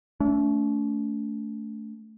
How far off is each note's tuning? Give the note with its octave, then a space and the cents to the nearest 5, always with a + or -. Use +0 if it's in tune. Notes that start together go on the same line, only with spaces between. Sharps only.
A3 +0 D4 -45